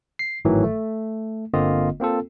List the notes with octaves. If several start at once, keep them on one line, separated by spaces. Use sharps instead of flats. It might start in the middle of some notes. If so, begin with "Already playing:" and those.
C7
G#1 A2 D#3 E3 F#3
A3
G1 D3 A#3 C4 F4 D#5
A#3 C4 F4 A4